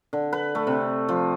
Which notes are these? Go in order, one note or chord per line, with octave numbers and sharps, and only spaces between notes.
D3
B4
A3
C3
F3